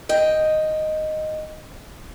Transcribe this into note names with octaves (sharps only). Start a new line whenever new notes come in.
D#5 G5